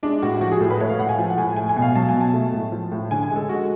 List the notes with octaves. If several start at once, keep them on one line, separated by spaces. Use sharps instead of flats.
G#3 D4
A2 F#4
F3 F#4
G#4
A2 A4
B4
A3 C#5
F5
A2 F#5
G#5
F3
F#5
A2 G#5
A3 G#5
G#5
B2
F5
F#3 A5
G#5
B2
A5
A3
A2
F3
A2
D3 G#5
G#5
G#3
A4
G#3 F#4